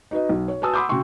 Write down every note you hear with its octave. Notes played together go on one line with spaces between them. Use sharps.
D#4 F#4 B4 D#5
B1
C#5
F#4 B4 G#5 A5 D#6 E6
F#5 B5 C6 D6 D#6 G6
C#3 F#4 G5 C6 C#6